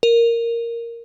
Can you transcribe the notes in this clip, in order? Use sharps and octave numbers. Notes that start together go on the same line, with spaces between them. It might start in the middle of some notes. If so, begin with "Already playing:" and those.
A#4